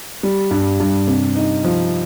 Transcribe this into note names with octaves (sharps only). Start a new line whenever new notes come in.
G3
G2
G2
C3
D#4
F3